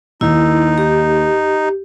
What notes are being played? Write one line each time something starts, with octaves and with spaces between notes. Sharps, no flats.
D#2 A#3 D#4 E4
G4